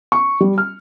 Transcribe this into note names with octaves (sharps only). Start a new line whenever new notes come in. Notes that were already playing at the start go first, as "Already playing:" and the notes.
C#6
G3
F6